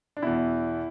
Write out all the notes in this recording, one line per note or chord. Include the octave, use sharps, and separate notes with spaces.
D4
E2 B2 E4